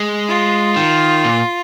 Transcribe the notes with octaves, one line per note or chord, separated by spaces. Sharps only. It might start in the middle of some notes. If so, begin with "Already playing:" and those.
Already playing: G#3
F4
D#3
A#2